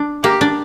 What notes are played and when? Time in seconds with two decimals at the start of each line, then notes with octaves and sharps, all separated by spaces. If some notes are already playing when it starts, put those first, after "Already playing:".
Already playing: D4
0.23 A#3 G4
0.41 D4